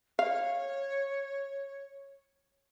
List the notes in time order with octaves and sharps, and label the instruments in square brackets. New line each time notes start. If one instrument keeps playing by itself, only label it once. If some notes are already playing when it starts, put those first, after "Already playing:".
[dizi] C#5 [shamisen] F5